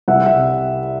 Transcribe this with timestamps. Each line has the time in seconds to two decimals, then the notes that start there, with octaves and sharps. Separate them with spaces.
0.08 C2 E5 F#5
0.26 E5 F#5
0.36 C3